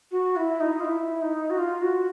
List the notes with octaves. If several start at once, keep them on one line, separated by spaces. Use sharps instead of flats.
F#4
E4
D#4
F4
E4
D#4
F#4
F4
F#4